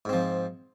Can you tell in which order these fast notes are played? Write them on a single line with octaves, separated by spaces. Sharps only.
G#2 C4 F3